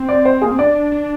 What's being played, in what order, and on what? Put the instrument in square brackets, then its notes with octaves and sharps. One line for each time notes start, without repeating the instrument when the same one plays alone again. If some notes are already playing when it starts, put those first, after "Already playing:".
Already playing: [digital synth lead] C4
[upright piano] D5
C5
[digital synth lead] A#3 [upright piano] G#4
[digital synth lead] C4
[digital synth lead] D4 [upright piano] D5
[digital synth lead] D4